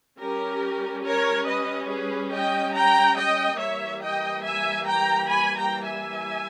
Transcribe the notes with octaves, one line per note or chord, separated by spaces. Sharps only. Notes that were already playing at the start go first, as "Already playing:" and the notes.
G3 C#4 G4 A#4
A#4 C#5
B4 D#5
G#4 B4
D#5 G5
G5 A#5
D#5 G5
E3 G3 A#3 C#5 E5
D#5 G5
E5 G#5
G5 A#5
G#5 B5
G5 A#5
E5 G#5